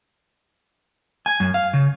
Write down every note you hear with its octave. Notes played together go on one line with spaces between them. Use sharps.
G#5
F#2
F5
C#3